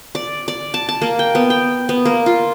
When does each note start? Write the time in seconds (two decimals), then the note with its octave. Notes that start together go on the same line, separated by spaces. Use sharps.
0.15 D5
0.48 D5
0.74 A5
0.89 A5
1.02 A#3
1.19 G5
1.35 B3
1.50 G5
1.89 B3
2.05 A#3
2.26 F4